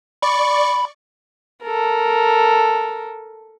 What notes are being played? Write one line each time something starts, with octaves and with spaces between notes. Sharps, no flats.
D5 B5 C#6
A4 A#4